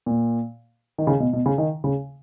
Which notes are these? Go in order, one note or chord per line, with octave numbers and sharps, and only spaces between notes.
A#2
D#3
C#3
B2
B2
C#3
D#3
C#3